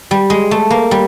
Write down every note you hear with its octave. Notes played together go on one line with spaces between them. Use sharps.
G3
G#3
A3
A#3
G3